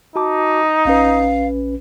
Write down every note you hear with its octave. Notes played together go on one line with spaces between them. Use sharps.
D#4 F#4 A5 D6
A#1 C#4 B4 F5